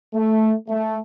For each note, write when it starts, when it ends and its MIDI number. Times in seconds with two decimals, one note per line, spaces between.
0.14 0.53 57
0.68 0.96 57